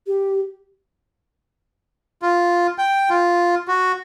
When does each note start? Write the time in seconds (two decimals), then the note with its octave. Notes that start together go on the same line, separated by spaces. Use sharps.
0.07 G4
2.22 F4
2.78 G5
3.10 F4
3.68 F#4